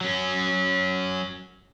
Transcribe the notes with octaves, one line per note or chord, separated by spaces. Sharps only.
F#3 C#4